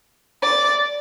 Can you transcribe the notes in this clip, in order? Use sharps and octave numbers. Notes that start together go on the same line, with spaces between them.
D5